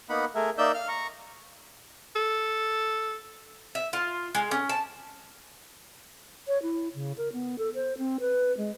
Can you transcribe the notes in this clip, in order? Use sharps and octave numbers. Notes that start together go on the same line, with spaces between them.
A#3 B3 D#4 F#5 B5
A3 G#4 A#4 E5
A#3 D#4 D5 E5 E6 G6
F5 F6
A#5 C#6
A4
E5
F4
G#3
C#4
A5
C#5
E4
C#3
A#4
B3
A4
C5
C4
B4
G#3